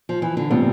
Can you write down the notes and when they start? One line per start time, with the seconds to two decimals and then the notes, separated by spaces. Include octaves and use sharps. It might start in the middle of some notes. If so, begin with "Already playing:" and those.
0.09 F3
0.22 E3
0.37 D3
0.50 A2 C3 E3 G3 B3 F4